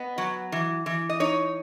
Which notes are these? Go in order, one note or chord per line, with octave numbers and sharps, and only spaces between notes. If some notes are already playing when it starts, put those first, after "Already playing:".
Already playing: B3 D#5
F#3
E3
E3
D#5
D#4 C#5